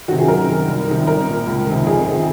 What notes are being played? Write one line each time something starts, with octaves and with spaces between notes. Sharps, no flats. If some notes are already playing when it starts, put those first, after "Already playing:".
C3 D#3 F#4
G#4
F#2 A#4
D#3
C2
C3 D#3
C2 A#4
A#2
C#2
C3 D#3
F2 G#4
C3 D#3